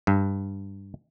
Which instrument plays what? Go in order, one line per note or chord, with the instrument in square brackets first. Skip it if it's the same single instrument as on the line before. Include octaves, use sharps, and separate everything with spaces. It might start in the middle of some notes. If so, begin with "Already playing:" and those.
[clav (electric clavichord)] G2